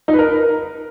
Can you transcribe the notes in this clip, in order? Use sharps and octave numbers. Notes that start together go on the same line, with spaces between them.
D#4
B4
A#4